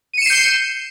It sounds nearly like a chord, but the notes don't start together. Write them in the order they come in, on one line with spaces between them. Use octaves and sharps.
D#7 C#7 E7 C7 G6